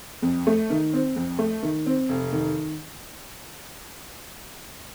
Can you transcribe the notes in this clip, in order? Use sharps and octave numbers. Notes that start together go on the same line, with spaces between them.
F2
A3
D#3
C4
F2
A3
D#3
C4
F1
D#3